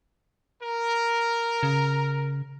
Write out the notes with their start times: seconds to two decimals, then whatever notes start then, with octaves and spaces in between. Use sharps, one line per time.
0.62 A#4
1.63 C#3